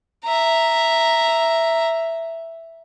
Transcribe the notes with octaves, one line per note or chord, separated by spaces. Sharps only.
E5 A#5